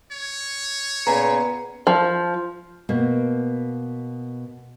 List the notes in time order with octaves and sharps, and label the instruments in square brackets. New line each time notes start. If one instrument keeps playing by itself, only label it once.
[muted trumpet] C#5
[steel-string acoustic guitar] A#2 B3 [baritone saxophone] C#3 [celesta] A#5
[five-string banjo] F3
[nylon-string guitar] B2 A#3